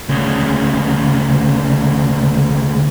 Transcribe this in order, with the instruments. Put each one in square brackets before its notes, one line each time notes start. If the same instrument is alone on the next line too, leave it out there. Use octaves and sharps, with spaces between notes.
[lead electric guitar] D2 C#3